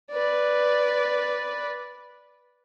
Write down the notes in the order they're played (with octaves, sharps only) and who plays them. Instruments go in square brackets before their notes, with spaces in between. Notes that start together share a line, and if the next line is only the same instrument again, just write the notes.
[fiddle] B4 D5